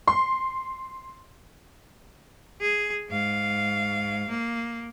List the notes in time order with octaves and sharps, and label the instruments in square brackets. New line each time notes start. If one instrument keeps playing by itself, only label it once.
[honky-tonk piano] C6
[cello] G#4
G#2 F5
A#3